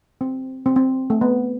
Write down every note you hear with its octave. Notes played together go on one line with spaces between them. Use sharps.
C4
C4
C4
A3
B3